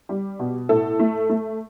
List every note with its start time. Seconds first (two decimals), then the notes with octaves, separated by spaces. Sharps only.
0.09 G3
0.39 B2
0.69 A2 A4
0.99 A3
1.29 A3